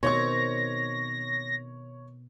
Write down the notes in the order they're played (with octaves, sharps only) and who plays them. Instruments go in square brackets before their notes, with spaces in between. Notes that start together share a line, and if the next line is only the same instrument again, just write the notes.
[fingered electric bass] B2 [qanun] D#3 C4 [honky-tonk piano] C#5 C#6 [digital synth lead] A#6